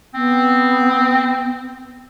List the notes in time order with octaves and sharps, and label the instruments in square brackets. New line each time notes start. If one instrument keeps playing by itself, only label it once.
[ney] B3 [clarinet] C4